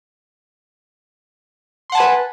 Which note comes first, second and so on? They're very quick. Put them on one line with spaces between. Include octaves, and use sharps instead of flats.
C6 F#5 A5 G#5 B4